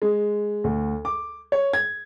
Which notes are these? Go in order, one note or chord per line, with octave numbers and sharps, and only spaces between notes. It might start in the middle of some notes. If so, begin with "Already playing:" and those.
G#3
D2
D6
C#5
G#6